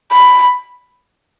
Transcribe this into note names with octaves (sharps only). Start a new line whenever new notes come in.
B5